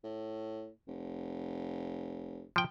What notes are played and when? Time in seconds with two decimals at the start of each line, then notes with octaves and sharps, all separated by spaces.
0.04 A2
0.87 F1
2.56 F3 G5